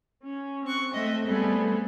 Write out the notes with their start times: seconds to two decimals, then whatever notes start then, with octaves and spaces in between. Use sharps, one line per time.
0.24 C#4
0.64 C4 C#6 F#6
0.93 A3 C4 D#5 E5
1.26 G3 A3 B3 C4 G#4 A4